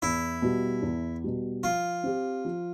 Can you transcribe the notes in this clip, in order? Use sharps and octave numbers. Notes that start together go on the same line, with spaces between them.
E2 E4
B2 G3
E2
B2 G3
F3 F4
C4 G4
F3